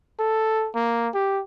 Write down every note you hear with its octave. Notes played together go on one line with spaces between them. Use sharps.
A4
A#3
G4